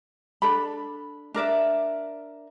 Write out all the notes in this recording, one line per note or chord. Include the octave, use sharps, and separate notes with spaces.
D4 A4 B5
D4 A#4 D5 E5